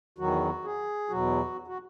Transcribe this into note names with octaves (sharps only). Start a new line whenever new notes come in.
E2 D#3 F#3 F#4
G#4
E2 B2 F#3 F#4
F#4